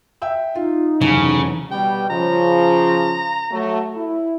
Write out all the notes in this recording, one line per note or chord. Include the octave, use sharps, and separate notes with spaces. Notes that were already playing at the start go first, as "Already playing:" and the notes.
E5 G5 E6
D#4 F4
F1 C#3 E3 F#3 C#4 G#5
B2 G3 G5
C#3 F3 A#5
F#3 A3
E4